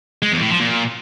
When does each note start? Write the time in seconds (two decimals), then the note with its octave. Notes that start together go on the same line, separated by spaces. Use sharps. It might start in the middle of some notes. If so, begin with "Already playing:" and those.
0.22 G#3
0.32 E2
0.41 A2
0.51 F3
0.60 A#2